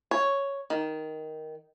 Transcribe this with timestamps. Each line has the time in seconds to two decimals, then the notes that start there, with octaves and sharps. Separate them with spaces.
0.11 C#5
0.70 D#3